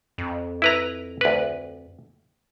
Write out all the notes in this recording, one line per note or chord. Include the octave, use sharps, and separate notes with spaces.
F2
E4 B4 A#5
D2 B4